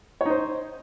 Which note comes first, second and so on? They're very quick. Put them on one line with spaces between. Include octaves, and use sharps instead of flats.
C#5 D#4 C5